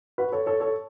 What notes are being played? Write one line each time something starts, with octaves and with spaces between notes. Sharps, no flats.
F#4 B4
A4 C#5
A4 C#5
A4 C#5